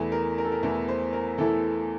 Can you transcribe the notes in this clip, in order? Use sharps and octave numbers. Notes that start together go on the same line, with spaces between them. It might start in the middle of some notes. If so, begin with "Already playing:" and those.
Already playing: E2 E3 A3 E4
A#4
A#4
A4
A#4
E2 E3 A3 E4 A#4
C5
A#4
E2 E3 A3 E4 A4